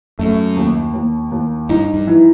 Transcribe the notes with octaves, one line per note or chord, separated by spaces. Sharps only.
F#2 A3
D#2
D#2
D#2
G2 D#4
G2
E3